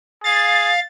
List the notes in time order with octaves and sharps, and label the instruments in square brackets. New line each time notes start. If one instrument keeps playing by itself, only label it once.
[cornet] G#4 [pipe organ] F5 [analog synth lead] A6